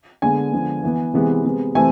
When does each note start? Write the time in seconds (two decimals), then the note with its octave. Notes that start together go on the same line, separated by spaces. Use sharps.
0.22 D3 G#3 B3 G#5
0.52 D3 F3 G#3 B3
0.83 E3 B3
1.14 C3 E3 G#3 B3
1.45 C3 G#3 B3
1.75 C3 E3 A3 C4 G#5